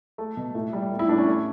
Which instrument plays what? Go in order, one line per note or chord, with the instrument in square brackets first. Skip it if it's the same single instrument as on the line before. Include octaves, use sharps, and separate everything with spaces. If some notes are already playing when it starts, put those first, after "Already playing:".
[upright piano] A3
B2
A2
G3
A2
E4
A2 D4
C#4
A3